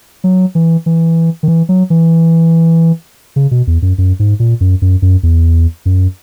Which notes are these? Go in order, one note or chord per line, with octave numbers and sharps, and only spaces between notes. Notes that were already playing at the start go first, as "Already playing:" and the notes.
F#3
E3
E3
D#3
E3
F#3
E3
C#3
B2
E2
F#2
F#2
G#2
A#2
F#2
F#2
F#2
E2
F#2